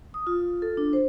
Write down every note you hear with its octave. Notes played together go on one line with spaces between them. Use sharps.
D#6
F4
A4
D4
C5